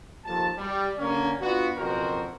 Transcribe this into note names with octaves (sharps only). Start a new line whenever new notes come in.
D#2 F3 A4 A5
G3
D3 A#3 C#4
B3 D4 F4 F#4
F#1 F2 B2 F#4 A#4 C5